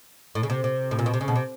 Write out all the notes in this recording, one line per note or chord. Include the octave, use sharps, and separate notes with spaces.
A2
C#3
C3
C3
A2
A#2
B2
C3
C#3
B2
C3